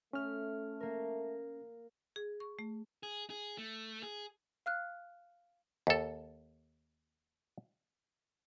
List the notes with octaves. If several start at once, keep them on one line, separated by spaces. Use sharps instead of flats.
A3 C#4 F6
A#3 A#4
G#4
C#6
A3
G#4
G#4
A3
G#4
F5 F6 F#6
D#2 A4